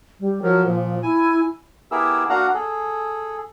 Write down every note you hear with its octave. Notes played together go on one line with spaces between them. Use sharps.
G3
F3 F#3 A#4
A#2 F3
F3
E4 G#5
B3 E4 G4 G#4 A#4 E6
A#3 D4 F#4 F5 F#5 A#5
G#4 A4